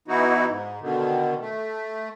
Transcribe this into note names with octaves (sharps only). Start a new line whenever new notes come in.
E3 B3 D#4 E4 F#4
G#2
B2 D3 D#3
A3